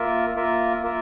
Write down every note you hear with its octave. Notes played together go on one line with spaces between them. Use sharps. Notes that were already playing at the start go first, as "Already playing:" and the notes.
Already playing: A#3 F4 A#4 E5
A#3 F4 A#4 E5
A#3 F4 A#4 E5